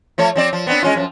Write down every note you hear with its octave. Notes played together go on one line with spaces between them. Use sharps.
F3 A3 C#5
F3 C4 D5
F3
B3 C4 D4
G#3 C#4 F4
F#2 F3